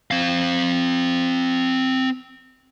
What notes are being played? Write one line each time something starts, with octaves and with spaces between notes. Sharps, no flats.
C4 F5